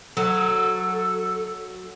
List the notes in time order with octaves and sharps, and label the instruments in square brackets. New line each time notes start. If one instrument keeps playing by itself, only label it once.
[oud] F#3 [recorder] A4